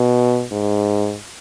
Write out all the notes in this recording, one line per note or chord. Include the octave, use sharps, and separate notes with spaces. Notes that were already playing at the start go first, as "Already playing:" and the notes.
Already playing: B2
G#2